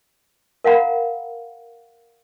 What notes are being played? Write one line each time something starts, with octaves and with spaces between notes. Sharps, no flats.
A#4 F5 F#5 A#5 B5